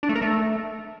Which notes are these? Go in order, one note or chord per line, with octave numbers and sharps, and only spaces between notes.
D4
A3
A#4
A3